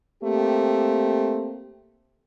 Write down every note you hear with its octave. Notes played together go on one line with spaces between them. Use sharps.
A3 A#3 C4 G4